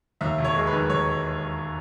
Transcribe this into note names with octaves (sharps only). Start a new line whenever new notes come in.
D#2 E5
E1
C#5
G#3
B4
D#3
D#2 C#5